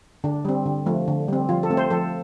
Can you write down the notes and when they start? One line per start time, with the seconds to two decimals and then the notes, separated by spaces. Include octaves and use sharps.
0.24 D3 D4
0.45 G3 C4
0.66 D3
0.86 F3 A3
1.08 D3
1.28 G3 C4
1.49 F3 F4
1.63 A4
1.70 A3 C4
1.77 C5
1.91 F3 A4